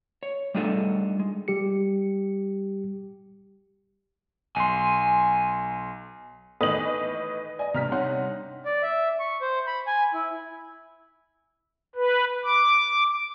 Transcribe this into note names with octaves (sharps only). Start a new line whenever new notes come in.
C#5
G3 A3 D4 D#4 F4 A4
G#3
G3 G4 C#7
B1 G#5 C6
A2 D#3 E3 B4 D#5 D#6 F#7
D5 D#5 G#5
G2 C3 A#5 F6 B6
D#4 C#5 F#5 C6
D5
E5
C#6
C5
B5
G#5
E4
B4
D6